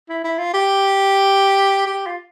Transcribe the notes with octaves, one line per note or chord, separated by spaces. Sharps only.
E4
E4
F4
G4
G4
F4